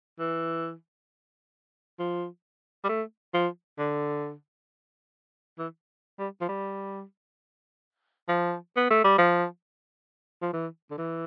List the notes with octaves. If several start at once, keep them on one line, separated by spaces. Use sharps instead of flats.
E3
F3
G3
A3
F3
D3
E3
G3
F3
G3
F3
B3
A3
G3
F3
F3
E3
D3
E3